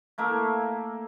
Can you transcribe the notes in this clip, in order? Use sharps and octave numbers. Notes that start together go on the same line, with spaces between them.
A3 A#3 E5